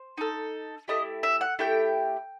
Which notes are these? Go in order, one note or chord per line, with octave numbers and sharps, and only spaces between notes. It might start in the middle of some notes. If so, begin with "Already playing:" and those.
Already playing: C5
D#4 A4
A3 E4 G4 D#5
E5
F#5
A3 E4 G4 G5